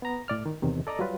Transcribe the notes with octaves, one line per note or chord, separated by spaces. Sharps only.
B3 A#5
A2 D5 F6
D#3
E2 C3 D#3
A4 D5 D#5 A#5
F#3 G3 F4 B4